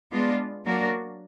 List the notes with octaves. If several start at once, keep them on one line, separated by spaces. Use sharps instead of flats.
G#3 B3 D4 F4
F#3 A#3 D4 F#4 A#4